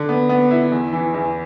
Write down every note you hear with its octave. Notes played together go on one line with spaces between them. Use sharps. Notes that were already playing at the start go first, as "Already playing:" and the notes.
Already playing: D3
B3
B3
E4
E2
E3
E2